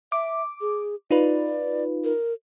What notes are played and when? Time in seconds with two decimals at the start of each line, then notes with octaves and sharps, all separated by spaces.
0.12 E5 D6
0.61 G#4
1.11 D#4 F4 B4 D5
2.04 A#4